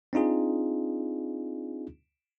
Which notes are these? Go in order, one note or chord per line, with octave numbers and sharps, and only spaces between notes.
C4 D4 D#4 F4 G#4